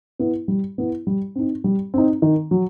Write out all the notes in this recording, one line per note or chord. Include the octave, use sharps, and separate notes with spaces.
B3 E4
G3
B3 E4
G3
C4 D#4
G3
C4 D#4
D#3
F#3